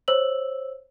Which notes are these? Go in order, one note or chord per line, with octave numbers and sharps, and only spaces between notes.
C5 C#5 E6 F#7